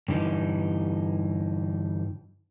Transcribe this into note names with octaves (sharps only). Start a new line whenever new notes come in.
G2 D3 E3 D#4